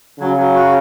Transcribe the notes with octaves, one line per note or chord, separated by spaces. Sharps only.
C#3 F#3
F#3
F#4